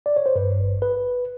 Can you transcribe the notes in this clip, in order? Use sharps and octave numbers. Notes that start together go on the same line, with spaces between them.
D5
C#5
C5
G2 B4
G#1
B4